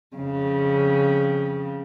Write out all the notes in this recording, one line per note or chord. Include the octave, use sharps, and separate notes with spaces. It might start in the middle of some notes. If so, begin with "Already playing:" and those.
F2 C#3